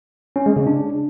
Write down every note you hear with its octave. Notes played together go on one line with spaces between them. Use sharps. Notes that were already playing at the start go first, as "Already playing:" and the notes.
C#4
G#3
C#3
D4